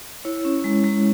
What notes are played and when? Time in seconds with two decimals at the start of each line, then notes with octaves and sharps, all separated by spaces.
0.25 E4 C#5
0.45 C#4
0.64 G#3
0.84 G#3